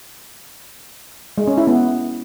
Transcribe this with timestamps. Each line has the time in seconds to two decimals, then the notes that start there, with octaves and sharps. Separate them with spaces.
1.38 G#3
1.47 C#4
1.57 E4
1.67 B3